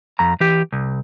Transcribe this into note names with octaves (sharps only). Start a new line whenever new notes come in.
F2 A#5
E3 G4
C2